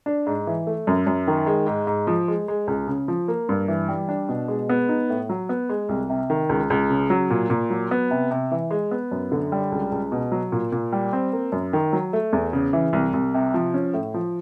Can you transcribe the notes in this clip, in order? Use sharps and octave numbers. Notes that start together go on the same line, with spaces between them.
D4
G#2
E3
A3
F#2
F#2
D#3
G#3
G#2
G#2
F3
G#3
G#3
C#2
C#3
F3
A#3
G2
E3
G3
D4
B2
G#3
B3
D#4
A2
F#3
B3
G#3
C2
C3
D#3
C#2
C#2
C#3
F#3
A#2
A#2
F#3
B3
C3
C3
E3
G#3
B3
F#2
D3
G3
C#2
C#2
B2
F#3
A#2
A#2
G3
C4
A#3
F#2
D#3
F#3
A3
E2
C#3
E3
C2
C2
C3
F3
C#4
A2
F3